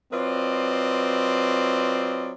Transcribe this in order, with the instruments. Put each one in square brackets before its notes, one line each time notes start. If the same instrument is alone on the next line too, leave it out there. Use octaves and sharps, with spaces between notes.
[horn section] F#3 C4 F4 B4 D5 D#5